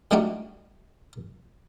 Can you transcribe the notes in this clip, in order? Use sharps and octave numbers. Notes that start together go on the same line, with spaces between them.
G3 A3 D4 D#4 F#4 G4